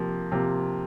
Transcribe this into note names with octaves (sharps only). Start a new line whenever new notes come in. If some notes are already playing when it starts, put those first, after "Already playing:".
Already playing: C3 F3 A#3
C3 F3 A#3